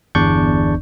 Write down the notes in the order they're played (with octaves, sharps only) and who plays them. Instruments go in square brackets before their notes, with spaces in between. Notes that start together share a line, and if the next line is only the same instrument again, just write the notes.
[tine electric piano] G1 E2 D4 D5 C#6 G6